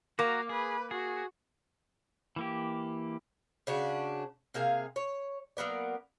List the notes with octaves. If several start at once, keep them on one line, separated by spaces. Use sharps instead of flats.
A#3 F#4 F5 A#5 D6
G#4 B4
F#4 G#4
E3 A#3 G4
C#3 C#4 D4 F#4
C3 A#3 G#4 F5
C#5
F#3 A#3 B3 D5